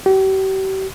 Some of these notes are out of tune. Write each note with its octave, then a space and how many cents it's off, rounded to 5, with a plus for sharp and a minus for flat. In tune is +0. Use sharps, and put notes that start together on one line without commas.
G4 -40